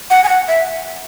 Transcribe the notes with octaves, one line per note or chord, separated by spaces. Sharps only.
F#5
G#5
F#5
E5